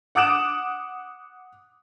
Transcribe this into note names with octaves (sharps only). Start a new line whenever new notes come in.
F#5 D6 D#6 F#6 D7 E7